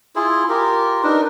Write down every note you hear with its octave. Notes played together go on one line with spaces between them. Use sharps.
E4 F4 G#4
F4 G4 A#4
D4 D#4 A#4 B4